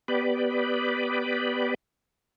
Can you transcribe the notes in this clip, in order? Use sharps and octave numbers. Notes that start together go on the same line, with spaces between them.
B3 G4 B4 D5